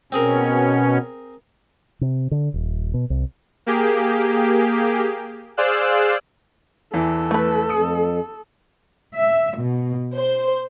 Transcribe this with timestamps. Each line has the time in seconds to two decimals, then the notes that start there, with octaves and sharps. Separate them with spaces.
0.12 B2 C4 C#4 G#4 A#4
2.01 C3
2.31 D3
2.54 D#1
2.94 B2
3.10 C2
3.66 A#3 G4 G#4
5.57 G#4 C5 D5 F5 E6 F#6
6.94 E2 E3 A4
7.31 A3 B4
7.69 F2 D#6 C#7
9.16 E5
9.59 B2
10.14 C5